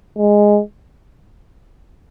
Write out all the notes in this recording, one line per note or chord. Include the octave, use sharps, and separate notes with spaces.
G#3